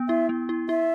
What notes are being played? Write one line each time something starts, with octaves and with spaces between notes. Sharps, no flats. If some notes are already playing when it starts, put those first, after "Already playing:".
Already playing: B3
E4 E5
B3
E4
E4 E5